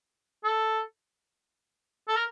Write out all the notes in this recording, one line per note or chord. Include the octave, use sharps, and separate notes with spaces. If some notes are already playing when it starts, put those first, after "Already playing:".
A4
A4
A#4